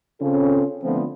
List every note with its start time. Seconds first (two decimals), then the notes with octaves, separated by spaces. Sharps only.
0.21 C#3 C4 C#4 F4 A4
0.83 D3 F3 A3 B3 C4 F4